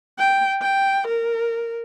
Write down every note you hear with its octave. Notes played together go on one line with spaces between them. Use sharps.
G5
G5
A#4